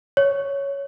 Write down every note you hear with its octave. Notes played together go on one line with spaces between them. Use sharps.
C#5